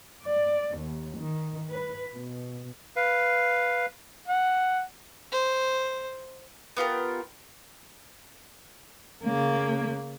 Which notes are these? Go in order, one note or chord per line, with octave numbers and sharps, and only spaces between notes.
D5
D#2
D#3
B4
B2
B4 F5
F#5
C5
B3 F4 G4 A#4
C#3 A#3